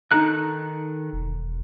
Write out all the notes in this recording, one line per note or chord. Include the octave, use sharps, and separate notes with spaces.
D#3 D#4 A4 A#5 F#6
E1